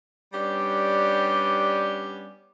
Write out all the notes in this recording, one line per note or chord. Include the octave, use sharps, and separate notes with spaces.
G3 B3 C#4 D4 G4